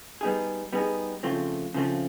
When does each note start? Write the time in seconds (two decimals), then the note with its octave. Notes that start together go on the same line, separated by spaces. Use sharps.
0.21 G3 B3 D#4 G#4
0.72 G3 B3 D#4 G#4
1.23 C#3 F3 A3 C4 F4
1.74 C#3 F3 A3 C4 F4